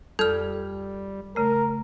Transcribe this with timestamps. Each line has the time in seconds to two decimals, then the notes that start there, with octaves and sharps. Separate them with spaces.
0.19 F2 G3 A4 F6 G6
1.36 C#3 A3 A#4